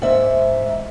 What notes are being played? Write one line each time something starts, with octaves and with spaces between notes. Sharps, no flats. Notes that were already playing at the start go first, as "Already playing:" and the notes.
G#2 E5